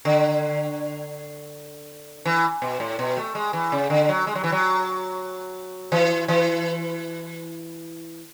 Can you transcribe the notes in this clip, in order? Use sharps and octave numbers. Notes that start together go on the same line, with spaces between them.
D3
E3
B2
A2
B2
A3
G#3
E3
C#3
D3
F#3
G#3
F#3
E3
F#3
E3
E3